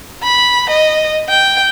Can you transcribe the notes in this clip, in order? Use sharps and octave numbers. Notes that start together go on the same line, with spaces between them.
B5
D#5
G5